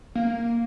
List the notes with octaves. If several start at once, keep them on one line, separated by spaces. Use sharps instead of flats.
A#3